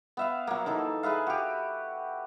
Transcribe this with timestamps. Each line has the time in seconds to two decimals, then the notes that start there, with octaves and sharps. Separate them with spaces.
0.17 B3 E5 F5
0.47 F#3 A#3
0.66 E3 D#4 A4
1.03 G#4 B4 E5 F5
1.27 F#4 G4